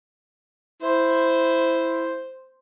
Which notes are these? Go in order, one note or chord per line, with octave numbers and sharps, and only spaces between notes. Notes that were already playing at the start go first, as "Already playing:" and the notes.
E4 C5